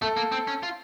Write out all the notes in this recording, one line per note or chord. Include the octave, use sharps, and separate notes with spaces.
A3 A4
A#3
C4
C#4
F4